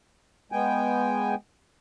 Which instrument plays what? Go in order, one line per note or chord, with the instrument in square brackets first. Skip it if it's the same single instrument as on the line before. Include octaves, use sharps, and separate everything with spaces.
[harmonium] G#3 B3 G5 G#5